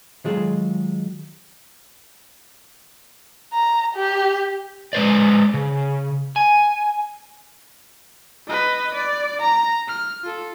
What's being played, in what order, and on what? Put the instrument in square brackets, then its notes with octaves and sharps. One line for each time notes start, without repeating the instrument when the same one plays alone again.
[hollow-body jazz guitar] D#3 F#3 G#3 F4 G#4 A4
[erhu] A#5
G4
[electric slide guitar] G#3 B4 C5 D5
C#3
G#5
[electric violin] B4 D#5
D5
A#5
F6
F4 A4